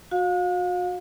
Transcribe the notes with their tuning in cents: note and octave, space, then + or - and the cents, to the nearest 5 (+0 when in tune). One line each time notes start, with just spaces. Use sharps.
F#4 -35 F5 +30